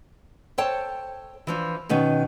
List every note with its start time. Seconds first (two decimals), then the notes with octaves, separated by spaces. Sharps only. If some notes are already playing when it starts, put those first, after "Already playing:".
0.58 A4 C5 C#5 G5 A5
1.47 E3 F3 D4
1.89 B2 D#3 B3 C#4